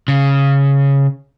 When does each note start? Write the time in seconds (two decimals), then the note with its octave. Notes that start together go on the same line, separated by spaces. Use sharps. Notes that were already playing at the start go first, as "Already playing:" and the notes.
0.08 C#3